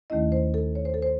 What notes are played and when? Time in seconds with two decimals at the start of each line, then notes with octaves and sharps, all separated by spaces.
0.10 D#2 D#3 A3 C#4 E4 D#5
0.32 C5
0.54 A4
0.75 C#5
0.85 C5
0.94 A4
1.02 C5